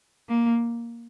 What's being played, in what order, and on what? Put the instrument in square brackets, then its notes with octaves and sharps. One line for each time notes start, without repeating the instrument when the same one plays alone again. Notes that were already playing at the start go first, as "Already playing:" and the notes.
[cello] A#3